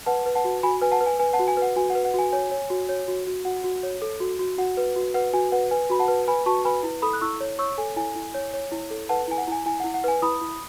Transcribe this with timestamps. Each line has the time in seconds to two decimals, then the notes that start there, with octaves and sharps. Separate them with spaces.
0.06 B4 F#5 A5
0.26 B4
0.35 F#5 A5
0.45 F#4
0.63 F#4 G#5 B5
0.82 B4 G#5
0.92 F#5 A5
1.01 B4
1.06 G#5
1.19 B4 G#5
1.33 F#5 A5
1.39 F#4
1.48 G#5
1.57 B4 F#5
1.76 F#4 G#5
1.90 F#5
1.95 B4
2.05 F#5
2.14 F#4 G#5
2.32 C#5 G#5
2.51 C#5
2.70 F#4
2.89 C#5
3.08 F#4
3.27 F#4
3.45 F#4 F#5
3.64 F#4
3.83 C#5
4.02 A4
4.20 F#4
4.39 F#4
4.58 F#4 F#5
4.77 B4
4.96 F#4
5.14 B4 F#5
5.33 F#4 G#5
5.52 B4 F#5
5.71 B4 G#5
5.90 F#4 B5
5.99 F#5 A5
6.08 B4
6.28 B4 G#5 B5
6.46 F#4 A5 C#6
6.65 B4 G#5 B5
6.83 E4
7.02 A4 B5 D#6
7.13 F#6
7.21 E4 C#6 E6
7.40 C#5
7.59 C#5 C#6 E6
7.78 A4 G#5
7.96 E4 G#5
8.16 E4
8.34 C#5
8.54 C#5
8.72 E4
8.91 A4
9.09 B4 F#5 A5
9.28 E4 G#5
9.38 F#5
9.47 E4 G#5
9.66 E4 G#5
9.80 E4 F#5
9.94 F#5
10.04 B4 G#5
10.22 E4 B5 D#6
10.41 E4